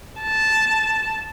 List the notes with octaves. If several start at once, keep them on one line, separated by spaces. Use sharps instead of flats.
A5